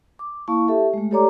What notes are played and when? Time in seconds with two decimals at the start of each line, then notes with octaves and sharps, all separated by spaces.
0.19 D6
0.48 A#3 E4 F5 A5 C#6
0.68 G4 A4 E5 A5
0.93 G#3 A3
1.11 G4 A4 C#5 D5 A#5 D6